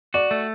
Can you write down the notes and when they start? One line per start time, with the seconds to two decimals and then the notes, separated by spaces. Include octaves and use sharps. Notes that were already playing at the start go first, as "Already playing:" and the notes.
0.14 F#4 D5
0.31 A3